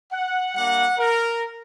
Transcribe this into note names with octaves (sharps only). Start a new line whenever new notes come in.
F#5
G3 A#3 D4 F#5
A#4